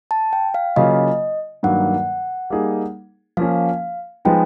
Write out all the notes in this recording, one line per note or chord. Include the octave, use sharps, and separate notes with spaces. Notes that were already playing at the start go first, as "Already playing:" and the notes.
A5
G5
F5
C#3 F#3 A#3 C#4 F4 D#5
G2 D#3 F#3 A#3 F#5
G3 A#3 D#4 G#4
F3 A#3 C#4 F5
F3 G#3 B3 D#4 G5